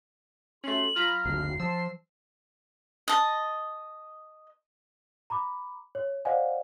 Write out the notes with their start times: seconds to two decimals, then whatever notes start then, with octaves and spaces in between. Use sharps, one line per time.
0.64 A3 C#4 F#4 G4 C6 F#7
0.96 F#3 F4 A#5 B5 F6
1.25 F#1 D2 C7
1.60 F3 A5 C6 E6
3.08 D#5 A5
5.30 A#5 B5 D6
5.95 C#5
6.25 C5 D5 D#5 F5 F#5 G#5